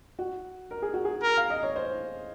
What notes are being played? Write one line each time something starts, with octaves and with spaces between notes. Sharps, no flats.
F#4
A#4
G#4
F#4
G#4
A#4
F5
D#5
C#5
C5